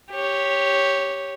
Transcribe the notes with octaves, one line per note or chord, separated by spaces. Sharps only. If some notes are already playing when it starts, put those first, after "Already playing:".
G4 C#5